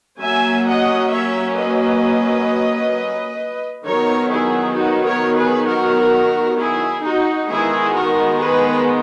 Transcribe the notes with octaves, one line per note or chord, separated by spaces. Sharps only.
F#3 A#3 C#4 E5 G#5
D#5 F#5
C#5 E5
B4 D#5
D#3 F#3 B3 A#4 C#5
E4 G#4
D#4 F#4
A#4 C#5
G#4 B4
F#4 A#4
E4 G#4
D#4 F#4
D#3 G#3 B3 E4 G#4
F#4 A#4
G#4 B4